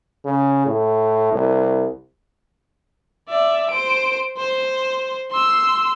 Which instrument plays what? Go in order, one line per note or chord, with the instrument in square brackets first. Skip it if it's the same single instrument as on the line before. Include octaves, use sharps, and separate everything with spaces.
[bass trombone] C#3
A2
C2
[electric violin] D5 E5
C5 D7
C5
C6 E6